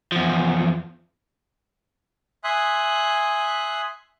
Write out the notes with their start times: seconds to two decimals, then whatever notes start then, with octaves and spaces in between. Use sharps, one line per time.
0.12 E2 F3
2.44 E5 G#5 C6 D#6 F#6